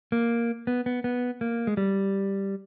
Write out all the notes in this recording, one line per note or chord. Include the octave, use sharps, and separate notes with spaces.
A#3
B3
B3
B3
A#3
G#3
G3